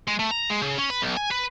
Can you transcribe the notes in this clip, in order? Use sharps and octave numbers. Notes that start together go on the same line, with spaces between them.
G#3
A3
A#5
G#3
C#3
C#4
B4
B1
G#5
B4